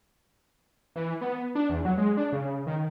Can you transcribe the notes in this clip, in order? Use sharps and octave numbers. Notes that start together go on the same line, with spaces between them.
E3
B3
D4
E2
F#3
G#3
D4
C#3
D#3